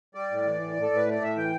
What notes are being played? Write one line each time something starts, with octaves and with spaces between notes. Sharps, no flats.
G3 D5
A2
E3
A2
A2
A4
A2
B4
A3 D5
A2 E5
E3 G5